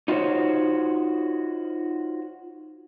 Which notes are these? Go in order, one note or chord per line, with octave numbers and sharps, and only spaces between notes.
D#4 F4 F#4 A4 C5 C#5